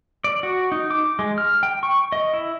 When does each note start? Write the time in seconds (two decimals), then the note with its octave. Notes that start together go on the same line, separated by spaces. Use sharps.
0.24 D5
0.43 F#4
0.72 D#4
0.90 D6
1.19 G#3
1.38 F6
1.63 G5
1.83 C#6
2.12 D#5
2.34 E4